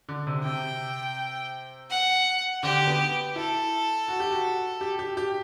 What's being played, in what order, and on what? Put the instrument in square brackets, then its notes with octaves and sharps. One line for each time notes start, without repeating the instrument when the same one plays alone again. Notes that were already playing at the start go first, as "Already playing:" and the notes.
[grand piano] D3
C3
[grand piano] C3 [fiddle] G5
[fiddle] F#5
[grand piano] D3 [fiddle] G4
[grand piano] B3
[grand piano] E4 [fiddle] A4
[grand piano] F#4
G4
F#4
G4
G4
G4